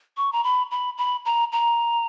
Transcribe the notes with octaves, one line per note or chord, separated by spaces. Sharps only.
C#6
A#5
B5
B5
B5
A#5
A#5